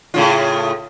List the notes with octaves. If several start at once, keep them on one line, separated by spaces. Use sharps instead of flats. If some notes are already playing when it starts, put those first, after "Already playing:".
A2 C#3 F4